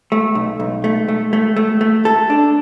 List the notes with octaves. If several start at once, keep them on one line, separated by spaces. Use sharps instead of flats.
A3
B1
B1
A3
A3
A3
A3
A3
A4
D4